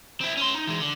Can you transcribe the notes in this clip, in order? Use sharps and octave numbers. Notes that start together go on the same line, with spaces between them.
C4 E4
C#4 C6
D#4
E3 G#3
D3